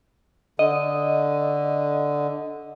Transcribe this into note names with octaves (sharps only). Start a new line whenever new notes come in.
D3 D#5